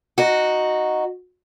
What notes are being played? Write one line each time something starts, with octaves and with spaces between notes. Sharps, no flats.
D#4 F#4